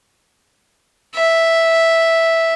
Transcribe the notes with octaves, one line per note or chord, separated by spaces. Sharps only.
E5